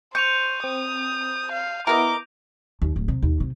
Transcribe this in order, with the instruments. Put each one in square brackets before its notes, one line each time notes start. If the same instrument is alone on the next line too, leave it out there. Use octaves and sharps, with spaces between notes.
[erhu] C5 [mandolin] C#6 [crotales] G6 D#7 F7
[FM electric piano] C4 [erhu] D#6
[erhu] F5
[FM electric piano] B3 E4 [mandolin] A#4 B4 D#5 [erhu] D6
[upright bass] D#2
D1
C3
D#2
C3